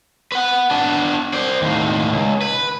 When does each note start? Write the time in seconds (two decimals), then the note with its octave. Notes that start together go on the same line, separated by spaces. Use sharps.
0.32 B4 F#5
0.71 B3 D4
1.33 C5 D5
1.62 D#2 A2
2.12 C#2
2.41 B4